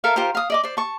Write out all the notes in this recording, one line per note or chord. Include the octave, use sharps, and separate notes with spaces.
A4 A#4 E5 F5
F4 G4 A#4 C5
F5 D#6
D5 D#5 D6
C5 D5
A5 C#6